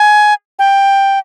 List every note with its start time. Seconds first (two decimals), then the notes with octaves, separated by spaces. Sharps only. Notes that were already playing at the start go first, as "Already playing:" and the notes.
Already playing: G#5
0.59 G5